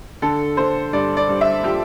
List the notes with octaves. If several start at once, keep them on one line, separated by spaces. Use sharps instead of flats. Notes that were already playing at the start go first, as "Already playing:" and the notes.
D3 A4
D3 C5
G2 D5
D5
G2
E5
F3 G4